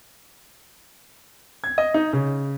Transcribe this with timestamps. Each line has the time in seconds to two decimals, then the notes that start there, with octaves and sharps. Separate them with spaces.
1.64 G#6
1.78 D#5
1.94 D#4
2.13 C#3